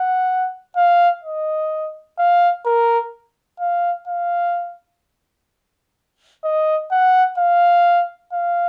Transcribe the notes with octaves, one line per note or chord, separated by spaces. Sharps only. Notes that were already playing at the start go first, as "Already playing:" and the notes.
Already playing: F#5
F5
D#5
F5
A#4
F5
F5
D#5
F#5
F5
F5